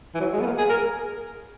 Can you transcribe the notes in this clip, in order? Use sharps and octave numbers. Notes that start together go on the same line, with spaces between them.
E3
F#3
G#3
B3
A#3
G#4
A#4